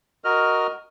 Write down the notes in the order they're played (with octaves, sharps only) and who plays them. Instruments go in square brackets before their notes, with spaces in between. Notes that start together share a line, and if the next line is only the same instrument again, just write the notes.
[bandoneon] F#4 A#4 D#5 F6